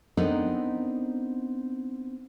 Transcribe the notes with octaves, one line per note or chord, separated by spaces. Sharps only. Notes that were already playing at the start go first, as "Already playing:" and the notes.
B3 C4 D4 D#4 A4 A#4